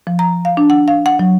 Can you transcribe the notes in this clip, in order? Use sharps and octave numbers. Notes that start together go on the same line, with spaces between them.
F3
A#5
F5
D4
F#5
F5
F#5
F#3